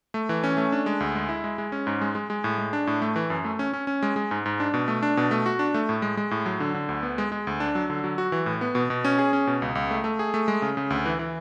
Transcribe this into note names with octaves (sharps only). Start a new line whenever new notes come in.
A3
E3
C#4
A3
D4
G#3
D2
G#3
E4
G#3
G#3
C#4
G#2
G#3
G#3
G#3
A2
G#3
D4
A2
A3
E3
F#2
A3
C#4
C#4
C#4
G#3
G#3
G#2
G#2
D4
B2
A3
D4
B2
A3
F#4
D4
A3
A2
G#3
G#3
A2
F#3
D3
D3
D2
B3
G#3
G#3
D2
D4
F#3
D3
F#3
F#4
E3
A2
B3
B2
B2
C#4
G#4
C#4
B2
C#2
C#2
A3
A3
G#4
A3
G#3
C#3
C#3
D2
E3
E3